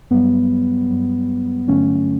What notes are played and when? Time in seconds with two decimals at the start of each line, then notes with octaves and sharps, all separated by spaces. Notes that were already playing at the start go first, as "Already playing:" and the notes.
0.10 G2 F#3 G3 B3
0.90 G2 F#3
1.68 G2 D3 F#3 A3 C#4